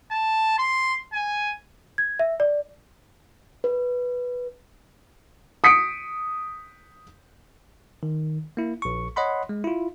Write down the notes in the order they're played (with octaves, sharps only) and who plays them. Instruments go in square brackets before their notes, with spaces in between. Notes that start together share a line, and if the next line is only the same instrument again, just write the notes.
[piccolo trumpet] A5
C6
G#5
[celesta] G#6
E5
D5
[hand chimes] B4
[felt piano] D#6 B6 C#7 D7
[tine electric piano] D#3
A#3 E4
A#1 C#6
C#5 D#5 F#5 B5 C6
G#3
E4 F4